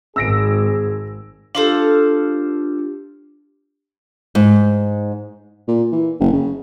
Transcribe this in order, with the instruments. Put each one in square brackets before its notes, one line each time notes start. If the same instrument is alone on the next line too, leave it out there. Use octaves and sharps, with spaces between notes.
[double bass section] G#1 [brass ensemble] G#4 [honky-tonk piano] E6 A#6 D7
[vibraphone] D4 F4 G4 [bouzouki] A4 C5 F5
[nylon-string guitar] G#2
[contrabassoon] A#2
E3
F#1
C#3